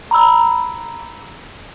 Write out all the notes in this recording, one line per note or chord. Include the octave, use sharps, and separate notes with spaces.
A#5 B5 E6